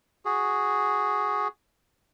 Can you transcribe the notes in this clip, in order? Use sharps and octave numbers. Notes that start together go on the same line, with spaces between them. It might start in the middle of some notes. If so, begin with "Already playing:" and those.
F#4 G#4